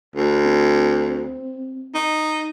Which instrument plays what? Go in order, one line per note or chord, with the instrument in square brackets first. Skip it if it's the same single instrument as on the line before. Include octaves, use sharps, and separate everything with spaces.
[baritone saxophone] D2
[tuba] C4
[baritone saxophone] D#4